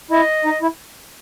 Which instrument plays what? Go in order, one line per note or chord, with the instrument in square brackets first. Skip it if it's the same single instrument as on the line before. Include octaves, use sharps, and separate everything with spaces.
[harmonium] E4 [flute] D#5
[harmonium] D#4
E4